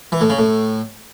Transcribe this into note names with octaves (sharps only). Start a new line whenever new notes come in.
E3
A2
C#3
A2